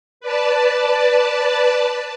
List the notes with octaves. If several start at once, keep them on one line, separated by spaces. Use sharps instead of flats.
B4 D5 A5